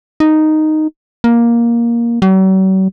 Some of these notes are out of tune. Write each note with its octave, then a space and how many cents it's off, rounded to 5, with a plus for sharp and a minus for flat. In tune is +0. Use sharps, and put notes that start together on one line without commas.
D#4 -5
A#3 +10
F#3 +45